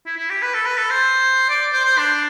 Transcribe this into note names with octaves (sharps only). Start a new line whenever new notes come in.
E4
E4
G4
B4
A4
B4
A4
C5
D5
C5
C5
D4